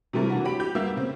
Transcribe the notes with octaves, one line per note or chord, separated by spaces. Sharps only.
C3 E3 G3 A3 A#4
E3 D4 F#4
F#3 G4 B5 D7
G4 G6
G3 A#3 B3 E5 E6
C#3 C4